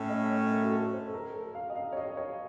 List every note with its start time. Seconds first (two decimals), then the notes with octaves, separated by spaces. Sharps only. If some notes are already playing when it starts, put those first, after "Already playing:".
Already playing: A2 A3 C#4 C#5
0.09 D#5
0.30 C#5
0.51 A#4
0.64 F#4
0.72 A4
0.93 C5
1.08 A4
1.13 A#4
1.34 A4
1.55 F5
1.70 D#5
1.75 F5
1.93 C#5
1.97 D#5
2.17 C#5